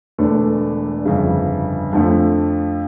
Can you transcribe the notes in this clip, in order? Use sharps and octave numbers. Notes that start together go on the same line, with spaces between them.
E1 E2 D3 A3 D4
G1 F2 C#3
F2 D3 F3 A3